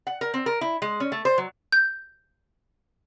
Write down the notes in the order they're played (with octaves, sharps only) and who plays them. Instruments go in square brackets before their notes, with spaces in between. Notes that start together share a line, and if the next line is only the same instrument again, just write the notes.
[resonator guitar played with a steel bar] F#5
A#4
C4
A#4
E4
G#3
C#4
A3
C5
F#3
[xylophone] G6